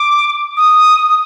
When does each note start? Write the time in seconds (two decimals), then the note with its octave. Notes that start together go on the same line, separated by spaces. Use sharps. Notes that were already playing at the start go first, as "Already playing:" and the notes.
Already playing: D6
0.57 D#6